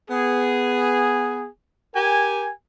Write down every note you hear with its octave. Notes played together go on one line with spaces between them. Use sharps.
B3 G#4
G4 A#4 G5 G#5